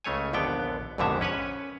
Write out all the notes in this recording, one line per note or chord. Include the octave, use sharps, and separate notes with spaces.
C#2 C#3 A3 C#5 G#5
A#1 D#2 D3 B3 G5
A#1 F2 G#2 B2 D3 E5
C#4 B4 C#5 G#5